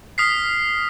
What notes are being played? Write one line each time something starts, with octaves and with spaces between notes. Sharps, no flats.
D#6 F6 B6 C7